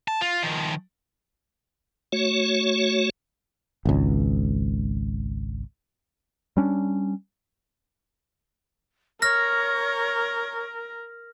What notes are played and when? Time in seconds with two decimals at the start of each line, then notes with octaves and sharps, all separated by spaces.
0.08 A5
0.21 F4
0.43 D#3 F3
2.12 A3 F#4 C#5
3.85 G#1 C#2
6.57 G3 C#4 D4
9.22 A#4 C#5 C#6 F6 A#6